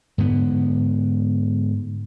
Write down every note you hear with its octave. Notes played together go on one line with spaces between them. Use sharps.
G#2 D3 B3